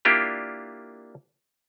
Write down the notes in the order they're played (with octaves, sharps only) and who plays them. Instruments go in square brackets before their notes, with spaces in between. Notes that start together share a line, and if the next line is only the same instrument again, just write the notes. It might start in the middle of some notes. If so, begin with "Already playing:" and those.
[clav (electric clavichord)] A#3 D4 E4 F4 G4 D5